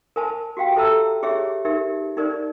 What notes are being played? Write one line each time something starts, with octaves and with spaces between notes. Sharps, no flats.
A#4 C5 G#5 A5
F#4 G4 F5 G5
A4 C5 E5 A5 A#5 E6
G4 G#4 C#5 E5
D#4 G4 A#4 E5
D#4 A#4 C5 D5